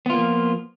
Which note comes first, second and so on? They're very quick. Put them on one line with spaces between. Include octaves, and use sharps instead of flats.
B3 F4 A#3 F3